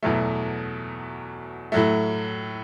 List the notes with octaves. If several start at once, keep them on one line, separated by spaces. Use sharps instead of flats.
E2 B2 F#3 A3
A2 F#3 A3